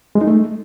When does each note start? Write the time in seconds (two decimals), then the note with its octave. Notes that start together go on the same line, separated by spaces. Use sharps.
0.15 G#3
0.21 D#4
0.27 A3